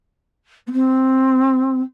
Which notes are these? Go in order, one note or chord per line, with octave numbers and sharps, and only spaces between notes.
B3
C4